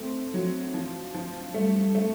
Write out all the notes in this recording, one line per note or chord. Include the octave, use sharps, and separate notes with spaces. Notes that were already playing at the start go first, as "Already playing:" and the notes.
Already playing: A3 C4
F3 F#3
E3 F3
F3
G3 A3
A3